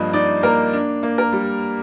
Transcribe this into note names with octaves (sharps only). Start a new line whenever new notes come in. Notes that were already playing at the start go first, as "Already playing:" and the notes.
Already playing: G2 F3 A#3 D#5
D#4 D5
A#3 A#4
D4
A#3
A#4
G3